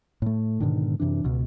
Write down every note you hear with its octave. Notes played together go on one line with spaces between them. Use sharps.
A2 A3
G#2 B2 D3 D#3
F#2 C3 E3 D4
C#2 B2